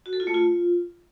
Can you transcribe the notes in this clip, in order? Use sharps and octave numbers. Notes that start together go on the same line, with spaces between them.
F#4
A4
F4
A3
F4